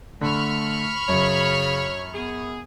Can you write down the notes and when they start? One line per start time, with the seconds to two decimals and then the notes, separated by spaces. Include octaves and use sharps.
0.21 D3 A3 B5 C#6 F6
1.09 F#2 C#3 C#5
2.14 B3 G#4